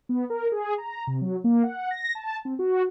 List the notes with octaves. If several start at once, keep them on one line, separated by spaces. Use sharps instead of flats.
B3
A#4
G#4
A#5
C3
F#3
A#3
F#5
A#6
A5
C4
F#4